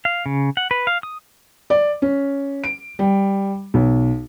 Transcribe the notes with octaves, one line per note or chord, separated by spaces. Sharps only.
F5
C#3
F#5
B4
F5
D#6
D5
C#4
D7
G3
B1